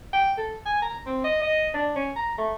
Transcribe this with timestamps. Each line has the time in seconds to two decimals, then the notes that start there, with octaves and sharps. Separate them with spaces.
0.13 G5
0.38 A4
0.66 G#5
0.82 A#5
1.06 C4
1.24 D#5
1.42 D#5
1.74 D4
1.96 C#4
2.16 A#5
2.38 A3